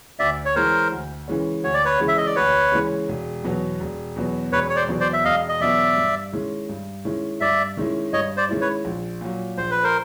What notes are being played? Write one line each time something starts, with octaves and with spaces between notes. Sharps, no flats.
D2 D5 E5
C#5
C#3 E3 G#3 C#4 A#4 C5
D2
C#3 E3 G#3 C#4
D2 C#5
D5
B4 C#5
C#3 E3 G#3 C#4
E5
D#5
D5
D2 B4 C#5
C#3 E3 G#3 C#4
E1
E2 B2 F#3 B3
E1
E2 B2 F#3 B3
E1 B4 C#5
C#5
C5 D5
E2 B2 F#3 B3
C5 D5
E5
E1 D#5 F5
D#5
E2 B2 F#3 B3 D5 E5
G2
D#3 G#3 C#4 E4
G2
D#3 G#3 C#4 E4
G2 D5 E5
D#3 G#3 C#4 E4
G2 C#5 D#5
C5 D5
D#3 G#3 C#4 E4
B4 C#5
A#1
A#2 F#3
A#1 C5
B4
A#4 C5